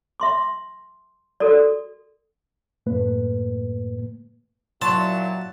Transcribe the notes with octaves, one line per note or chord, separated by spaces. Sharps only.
E5 C6 D6
F#4 A4 A#4 D5
F#2 A2 A3 A#3 B4
A#2 F#3 E4 A5 C6 C#6